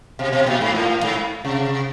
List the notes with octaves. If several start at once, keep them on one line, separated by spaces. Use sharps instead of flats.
B2
B2
A#2
G#2
A2
G#2
C3